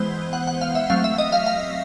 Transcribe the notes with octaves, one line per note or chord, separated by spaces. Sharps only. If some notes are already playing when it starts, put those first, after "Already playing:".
Already playing: E3 G#3 B3 C5
F#5
F#5
F5
E5
F#3 A3 C4 F5
E5
D#5
F5
F5